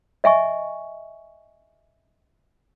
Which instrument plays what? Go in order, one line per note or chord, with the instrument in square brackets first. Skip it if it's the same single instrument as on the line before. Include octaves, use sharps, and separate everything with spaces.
[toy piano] D#5 E5 G#5 C#6